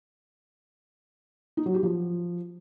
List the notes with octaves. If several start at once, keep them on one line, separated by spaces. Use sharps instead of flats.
D#4
F#3
G4
F3